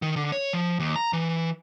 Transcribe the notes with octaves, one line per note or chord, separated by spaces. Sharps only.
D#3
D3
C#5
F3
D#2
A#5
E3